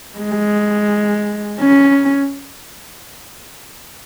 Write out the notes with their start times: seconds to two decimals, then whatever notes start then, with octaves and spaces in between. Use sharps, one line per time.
0.19 G#3
1.60 C#4